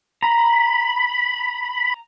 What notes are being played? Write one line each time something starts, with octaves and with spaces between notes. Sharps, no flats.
A#5 B5